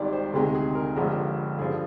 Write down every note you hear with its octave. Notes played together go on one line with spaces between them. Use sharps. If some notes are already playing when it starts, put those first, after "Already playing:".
Already playing: G#1 G#2 G3 D5
C5
D2 C3 D#3 G#3
G#4
A#4
G1 G2 F3 G#3 A#4
G2 D3 F3 G#4